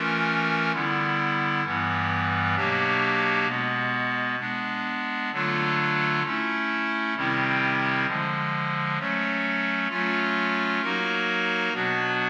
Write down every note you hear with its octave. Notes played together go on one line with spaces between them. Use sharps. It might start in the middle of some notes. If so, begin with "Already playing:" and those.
Already playing: E3 A3 C#4 F4 A#4
D3 G3 B3 E4
G2 E3 G3 B3
B2 F#3 A#3 D4 G4
B2 G#3 B3
G#3 B3 D4
D3 F#3 A3 D4 F4
A3 C#4 E4
C3 D#3 G3 C4 E4
D3 F3 G#3
F#3 A3 C#4
F#3 A3 C#4 F4
F#3 A#3 D#4 F#4 A#4
B2 F#3 B3 D4 F#4